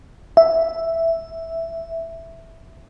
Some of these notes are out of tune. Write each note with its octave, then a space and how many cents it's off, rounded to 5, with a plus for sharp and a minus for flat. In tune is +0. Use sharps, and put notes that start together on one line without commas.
E5 +0